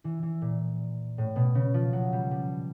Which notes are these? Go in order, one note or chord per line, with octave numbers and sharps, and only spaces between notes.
E3
E3
A#2
A2
B2
C#3
F3
F#3
G3
G3